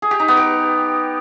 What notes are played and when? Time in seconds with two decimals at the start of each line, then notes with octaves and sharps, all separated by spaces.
0.02 G#4
0.11 G4
0.20 D#4
0.28 B3
0.37 G4